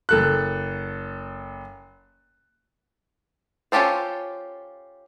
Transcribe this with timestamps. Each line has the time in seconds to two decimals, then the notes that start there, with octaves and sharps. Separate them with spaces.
0.09 F#1 A4 F#6
3.72 C#4 F4 G4 A4 C5